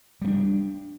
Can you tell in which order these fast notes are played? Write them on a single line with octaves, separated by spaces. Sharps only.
G3 A#3 D4